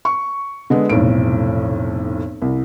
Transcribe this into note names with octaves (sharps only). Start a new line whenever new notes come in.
C#6
D3 G#3 B3
F1 B1 A2 D7
C2